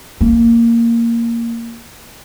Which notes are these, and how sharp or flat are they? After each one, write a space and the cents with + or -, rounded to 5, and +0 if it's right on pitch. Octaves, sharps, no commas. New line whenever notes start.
A#3 -5